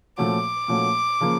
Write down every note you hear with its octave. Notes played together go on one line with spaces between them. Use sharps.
A#2 F3 A3 C#4 F#4 D6
A#2 F3 A3 C#4 F#4
C#3 F3 A#3